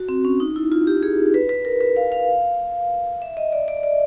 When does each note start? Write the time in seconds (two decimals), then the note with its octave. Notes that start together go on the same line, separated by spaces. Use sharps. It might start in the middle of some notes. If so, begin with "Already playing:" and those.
Already playing: F#4
0.09 C4
0.25 C#4
0.40 D#4
0.56 E4
0.72 F4
0.87 G4
1.03 G#4
1.34 B4
1.49 B4
1.65 A#4
1.81 B4
1.96 F5
2.12 F5
3.22 E5
3.37 D#5
3.52 D5
3.68 D5
3.83 D5